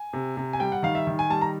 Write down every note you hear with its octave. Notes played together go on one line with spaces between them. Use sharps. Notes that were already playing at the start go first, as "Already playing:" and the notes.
Already playing: G#5
C3
C3
G#5
G3 G5
F#5
D#3 F5
E5
D#3
G#5
G3 A5
A#5